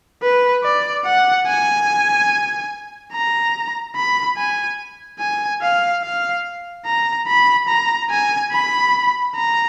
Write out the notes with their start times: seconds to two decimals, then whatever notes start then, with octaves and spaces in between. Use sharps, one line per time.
0.23 B4
0.64 D5
1.06 F#5
1.47 G#5
3.13 A#5
3.96 B5
4.37 G#5
5.19 G#5
5.62 F5
6.03 F5
6.85 A#5
7.28 B5
7.68 A#5
8.10 G#5
8.52 B5
9.36 A#5